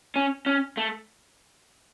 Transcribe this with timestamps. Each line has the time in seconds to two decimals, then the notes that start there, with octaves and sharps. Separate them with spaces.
0.16 C#4
0.46 C#4
0.77 A3